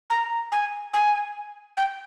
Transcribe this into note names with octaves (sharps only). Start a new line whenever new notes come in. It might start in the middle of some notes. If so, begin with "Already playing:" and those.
A#5
G#5
G#5
G5